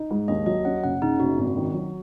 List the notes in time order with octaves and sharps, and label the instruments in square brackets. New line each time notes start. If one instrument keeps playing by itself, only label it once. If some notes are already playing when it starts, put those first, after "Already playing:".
Already playing: [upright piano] D#4
G#2
[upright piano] D#2 [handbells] D#5
[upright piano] F#3 [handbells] D#5
[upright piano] C#4 [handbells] F#5
[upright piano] F#1 [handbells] F#5
[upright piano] C#3 [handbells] D#4
[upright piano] F#1 [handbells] F#4
[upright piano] G#1
D#3
F#3